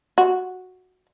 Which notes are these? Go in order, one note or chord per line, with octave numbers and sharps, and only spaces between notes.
F#4